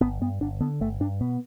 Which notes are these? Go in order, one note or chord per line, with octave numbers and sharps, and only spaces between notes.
G1 B3
G2 B3
G1 D4
D3 B3
G1 A3
G2 D4
B2 B3